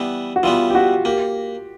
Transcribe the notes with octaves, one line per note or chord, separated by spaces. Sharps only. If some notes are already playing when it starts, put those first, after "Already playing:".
Already playing: E3 G3 B3
F#4
E3 G3 B3 F4
G4
F#4
A#3 G4